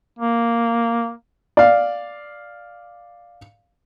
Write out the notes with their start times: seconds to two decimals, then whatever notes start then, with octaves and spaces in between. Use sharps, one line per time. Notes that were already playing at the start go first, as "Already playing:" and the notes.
0.19 A#3
1.57 D5 F5